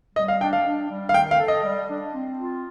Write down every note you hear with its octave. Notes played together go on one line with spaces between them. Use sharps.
G3 D#5
F5
D4 G5
F5
D4
G3
F5
D#3 G5
F5
A4
D#5
G3
D4
C4
F4